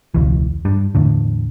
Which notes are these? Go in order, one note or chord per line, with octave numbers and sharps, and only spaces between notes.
E1 C#2 E3
G2
E2 A2 D3